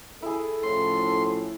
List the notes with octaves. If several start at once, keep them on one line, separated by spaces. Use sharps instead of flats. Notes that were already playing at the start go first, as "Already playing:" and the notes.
E4 G#4 A4
A2 F3 C#4 C6